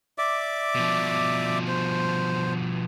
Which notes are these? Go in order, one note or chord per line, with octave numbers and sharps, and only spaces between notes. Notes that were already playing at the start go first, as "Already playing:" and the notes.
D5 E5 D6
B2 F3
C5